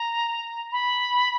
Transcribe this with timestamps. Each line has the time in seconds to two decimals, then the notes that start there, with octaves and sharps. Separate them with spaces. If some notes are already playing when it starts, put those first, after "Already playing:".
Already playing: A#5
0.72 B5